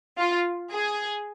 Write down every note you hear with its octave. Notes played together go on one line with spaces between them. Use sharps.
F4
G#4